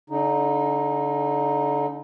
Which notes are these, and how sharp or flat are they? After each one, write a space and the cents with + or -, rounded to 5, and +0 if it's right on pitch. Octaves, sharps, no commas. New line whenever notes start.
D3 -35 D#4 +0